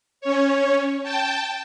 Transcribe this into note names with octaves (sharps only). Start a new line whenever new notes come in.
C#4 C#5
G5 A5